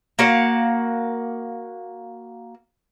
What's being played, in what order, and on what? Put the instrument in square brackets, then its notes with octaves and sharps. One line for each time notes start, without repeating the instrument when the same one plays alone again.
[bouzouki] A#3 F#4 F5 F#5